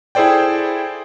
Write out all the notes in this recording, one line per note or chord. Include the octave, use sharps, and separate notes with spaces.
E4 G#4 A4 C5 D5 G5